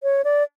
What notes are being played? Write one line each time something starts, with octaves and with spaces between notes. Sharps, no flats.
C#5
D5